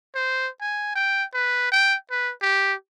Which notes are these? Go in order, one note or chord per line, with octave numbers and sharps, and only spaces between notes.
C5
G#5
G5
B4
G5
B4
G4